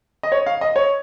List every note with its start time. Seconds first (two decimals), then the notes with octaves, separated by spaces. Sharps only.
0.23 D#5
0.32 C#5
0.46 F5
0.61 D#5
0.76 C#5